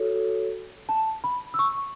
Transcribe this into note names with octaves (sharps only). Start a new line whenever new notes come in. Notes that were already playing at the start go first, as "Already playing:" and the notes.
Already playing: F#4 A4 C#5
A5
B5
E6
C#6